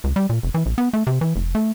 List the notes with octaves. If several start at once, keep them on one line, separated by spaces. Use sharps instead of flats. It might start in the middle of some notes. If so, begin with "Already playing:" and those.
C#2
G3
A#2
F1
E3
A#1
B3
A3
C3
E3
F1
A3